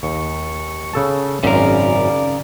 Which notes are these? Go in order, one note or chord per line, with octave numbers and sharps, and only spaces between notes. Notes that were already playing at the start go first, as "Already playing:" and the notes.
D#2 C#6
C#3 A4 A5
G#1 F#2 C#3 A#4 D5